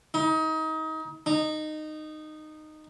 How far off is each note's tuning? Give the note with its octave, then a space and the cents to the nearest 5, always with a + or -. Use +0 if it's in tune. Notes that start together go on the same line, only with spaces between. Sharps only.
D#4 +30
D#4 -15